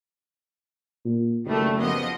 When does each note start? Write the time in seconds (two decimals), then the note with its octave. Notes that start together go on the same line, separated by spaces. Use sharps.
1.05 A#2
1.45 F#1 D#3 G3 A3
1.79 F3 B3 D#5